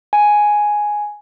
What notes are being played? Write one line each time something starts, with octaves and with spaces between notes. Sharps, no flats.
G#5